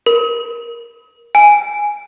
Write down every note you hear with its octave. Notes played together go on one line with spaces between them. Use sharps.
A#4
G#5